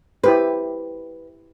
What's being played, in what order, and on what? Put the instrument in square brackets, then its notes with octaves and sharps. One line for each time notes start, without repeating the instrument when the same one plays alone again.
[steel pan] E4 G4 C5 [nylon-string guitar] B4